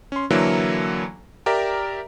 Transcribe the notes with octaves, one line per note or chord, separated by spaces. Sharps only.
C#4 C6
D3 E3 F#3 A#3 E4 A4
G4 A#4 D5 E5 A#5